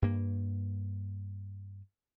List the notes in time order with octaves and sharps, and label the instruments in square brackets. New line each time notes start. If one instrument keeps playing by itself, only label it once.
[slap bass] G2 A#3